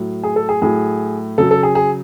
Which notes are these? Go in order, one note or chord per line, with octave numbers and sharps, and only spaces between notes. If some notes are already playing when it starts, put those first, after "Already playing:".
Already playing: A2 F#3
G#4
A4
G#4
A2 F#3 G#4
C#3 F#3 A4
A4
G#4
G#4